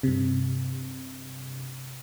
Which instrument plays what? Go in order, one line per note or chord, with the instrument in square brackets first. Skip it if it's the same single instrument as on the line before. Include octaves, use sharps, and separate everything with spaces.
[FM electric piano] G2 C3